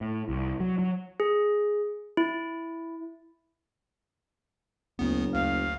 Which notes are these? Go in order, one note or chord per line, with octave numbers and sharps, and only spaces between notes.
A2
C2
F#3
F#3
G#4
E4
F#1 D2 B3
D2 F5